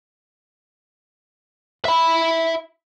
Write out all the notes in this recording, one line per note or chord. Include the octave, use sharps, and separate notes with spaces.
E5 B5